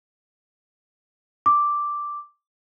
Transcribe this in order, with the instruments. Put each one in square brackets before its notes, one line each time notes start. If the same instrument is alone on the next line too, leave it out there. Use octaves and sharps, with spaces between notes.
[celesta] D6